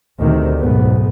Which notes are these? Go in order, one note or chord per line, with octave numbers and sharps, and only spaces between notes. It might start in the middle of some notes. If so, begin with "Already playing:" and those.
D2 C3 D#3
B1 G#2 B3